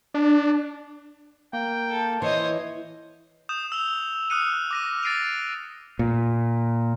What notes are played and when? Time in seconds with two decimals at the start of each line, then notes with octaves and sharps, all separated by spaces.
0.14 D4
1.53 A#3 G5
1.90 A4
2.22 E3 C5 C#5 D#5
3.49 D#6 G6 E7
3.72 E6 F7 G7
4.30 D#6 F6 F#6 C#7 D#7
4.71 D6 A#6 D#7
5.03 A6 A#6 C7 D7 D#7 F7
5.99 A#2